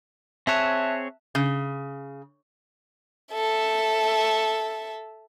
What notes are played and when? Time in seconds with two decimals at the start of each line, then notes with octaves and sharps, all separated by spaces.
0.47 C4 G#4 C#5 E5 A5 F#6
1.35 C#3
3.33 A4 E5